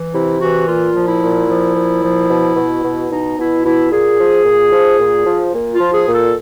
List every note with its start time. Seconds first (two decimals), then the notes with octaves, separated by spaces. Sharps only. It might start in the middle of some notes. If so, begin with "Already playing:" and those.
Already playing: E3
0.13 C3 E4
0.40 E3 F#4
0.67 A#2 F4
0.94 F3
1.08 E4
1.22 A#2
1.48 F3
1.75 A#2
2.02 F3
2.29 B2
2.56 B2
2.83 B2
3.10 B2 D#4
3.38 B2 E4
3.64 B2 E4
3.91 A#2 G#4
4.19 F3
4.45 A#2
4.72 F3
4.99 A#2
5.26 F3
5.53 A#2
5.74 F4
5.80 F3
5.93 G#4
6.08 A#2
6.14 A4